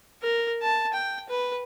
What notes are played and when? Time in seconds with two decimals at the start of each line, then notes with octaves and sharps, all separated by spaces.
0.23 A#4
0.62 A5
0.94 G5
1.29 B4